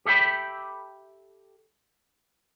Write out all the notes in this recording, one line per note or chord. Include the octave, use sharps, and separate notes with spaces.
G4 A4 E5 G5 B5